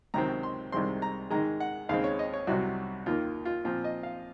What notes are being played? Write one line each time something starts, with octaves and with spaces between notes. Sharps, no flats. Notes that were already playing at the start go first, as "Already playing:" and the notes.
C#2 C3 D#3 F#3 C4 A#5
C6
C2 C3 D#3 G#3 C4 C6
A#5
G#2 D#3 G#3 A#5
F#5
D#2 C#3 G#3 C4 F5
C#5
D#5
C#5
C2 C3 F#3 F#4
D#2 D#3 A#3 F4
F4
A#2 F3 C4 F4
D#5
F5